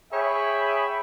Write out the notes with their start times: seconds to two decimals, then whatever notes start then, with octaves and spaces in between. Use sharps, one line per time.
0.13 G#4 C#5 E5 G5 B5